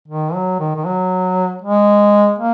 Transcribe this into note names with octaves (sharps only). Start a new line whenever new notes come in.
D#3
F#3
D#3
D#3
F#3
G#3
A#3